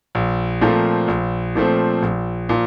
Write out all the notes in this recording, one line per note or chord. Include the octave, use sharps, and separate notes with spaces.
A#1
A#2 F3 A3 C4
A#1
A#2 F3 A3 C4
A#1
A#2 F3